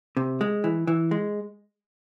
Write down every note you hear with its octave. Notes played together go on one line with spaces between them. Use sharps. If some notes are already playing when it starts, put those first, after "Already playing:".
C3
G#3
E3
E3
G#3